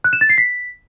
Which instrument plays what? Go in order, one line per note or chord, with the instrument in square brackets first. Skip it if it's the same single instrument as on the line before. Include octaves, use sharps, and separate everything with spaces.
[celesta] F#6
E7
A6
C7
B6